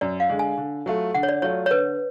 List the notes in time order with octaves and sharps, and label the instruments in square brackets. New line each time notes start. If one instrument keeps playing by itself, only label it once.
[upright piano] F#2 [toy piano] D5
[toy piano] F5
[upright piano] D3 G#3
[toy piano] G#5
[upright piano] D3
F#3 A3 F4
[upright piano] D3 [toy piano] F#5
[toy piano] C#5
D5
[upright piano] F#3 A3 F4 [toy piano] C#5
[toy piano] C#5
[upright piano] D3 [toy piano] B4